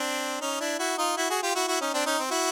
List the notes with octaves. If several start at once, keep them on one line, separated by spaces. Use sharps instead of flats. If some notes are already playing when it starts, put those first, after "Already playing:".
Already playing: C4 D4
C#4 D#4
D4 E4
E4 F#4
D#4 F4
E4 F#4
F#4 G#4
F4 G4
E4 F#4
E4 F#4
C#4 D#4
C4 D4
C#4 D#4
C4
E4 F#4